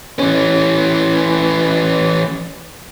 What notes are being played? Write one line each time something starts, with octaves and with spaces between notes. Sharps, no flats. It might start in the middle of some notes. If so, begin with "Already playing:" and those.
E3 C#4